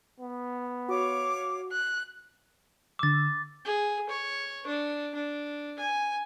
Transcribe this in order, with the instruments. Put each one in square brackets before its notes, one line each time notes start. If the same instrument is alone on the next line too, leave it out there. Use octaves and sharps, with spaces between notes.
[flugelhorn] B3
[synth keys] F#4 [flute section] C#5 F5 D6
[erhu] F#6
[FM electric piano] D3 E6 [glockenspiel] D6 A6
[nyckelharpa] G#4
C#5
D4
D4
G#5